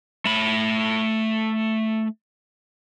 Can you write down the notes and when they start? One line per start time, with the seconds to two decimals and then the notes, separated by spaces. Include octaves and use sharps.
0.25 A3 B5